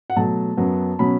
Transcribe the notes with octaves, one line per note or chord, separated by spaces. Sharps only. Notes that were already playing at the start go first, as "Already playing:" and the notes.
F#5
B2 F#3 A3 A5
F#2 F#3 B3
B2 F#3 C#4 B5